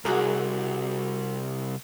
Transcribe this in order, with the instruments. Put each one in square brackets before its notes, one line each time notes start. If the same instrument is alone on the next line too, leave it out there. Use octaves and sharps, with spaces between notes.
[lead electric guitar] C2 [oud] F#4 G#4 A#4